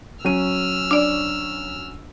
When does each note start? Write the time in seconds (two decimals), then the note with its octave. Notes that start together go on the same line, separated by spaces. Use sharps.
0.25 F#3 C#4 E6 F6 D#7
0.91 D4 D5